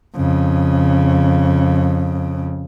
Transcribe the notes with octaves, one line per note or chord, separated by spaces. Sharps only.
F2 C#3